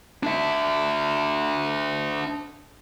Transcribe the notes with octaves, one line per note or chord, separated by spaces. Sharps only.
D4 E5